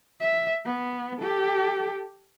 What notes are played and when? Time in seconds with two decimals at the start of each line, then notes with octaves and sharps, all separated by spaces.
0.21 E5
0.65 B3
1.20 G4 A4